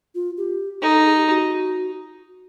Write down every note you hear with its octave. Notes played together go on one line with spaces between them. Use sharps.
F4
G4
D#4 A4
A4
G#4
G4
F#4